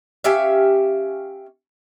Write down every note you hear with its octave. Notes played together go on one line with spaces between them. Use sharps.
C#4 G4 E5 F5